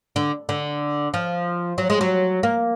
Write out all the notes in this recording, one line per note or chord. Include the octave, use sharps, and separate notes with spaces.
D3
D3
F3
F#3
G#3
F#3
A#3